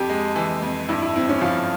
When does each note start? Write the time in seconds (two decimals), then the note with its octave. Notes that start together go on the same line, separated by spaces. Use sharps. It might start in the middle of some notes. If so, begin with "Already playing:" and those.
Already playing: F2 G4
0.10 G#3
0.36 E3
0.62 F2
0.89 G2 E4
1.02 E4
1.16 C4 E4
1.29 C#4
1.41 F3 F4